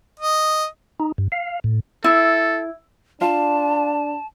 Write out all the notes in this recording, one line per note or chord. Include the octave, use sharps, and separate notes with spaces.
D#5
D#4
G2
F5
A2
E4 A4
D4 F4 F5 A5